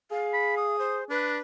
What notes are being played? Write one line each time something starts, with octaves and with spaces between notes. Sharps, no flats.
G#4 F5
B5
D#6
C5
D4 B4